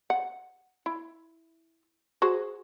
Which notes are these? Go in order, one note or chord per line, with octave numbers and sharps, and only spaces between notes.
F#5
E4
F#4 G#4 C5